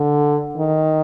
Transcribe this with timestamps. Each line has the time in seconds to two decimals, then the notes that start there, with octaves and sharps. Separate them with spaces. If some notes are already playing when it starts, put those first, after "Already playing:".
Already playing: D3
0.57 D#3